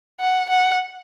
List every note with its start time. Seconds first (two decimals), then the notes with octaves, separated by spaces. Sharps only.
0.20 F#5
0.50 F#5